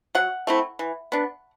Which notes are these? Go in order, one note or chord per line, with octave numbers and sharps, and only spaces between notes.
F#3 F#5
A3 C4 E4
E3
B3 D4